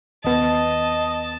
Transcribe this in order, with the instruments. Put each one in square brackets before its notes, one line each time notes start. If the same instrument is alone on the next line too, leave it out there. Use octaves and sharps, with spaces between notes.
[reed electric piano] D#2 B3 [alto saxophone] D#5 [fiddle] A5